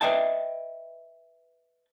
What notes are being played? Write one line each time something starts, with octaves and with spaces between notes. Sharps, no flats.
B4 C5 D#5 E5 G5 A5